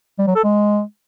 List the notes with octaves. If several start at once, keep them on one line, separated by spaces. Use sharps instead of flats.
G3
F#3
A4
G#3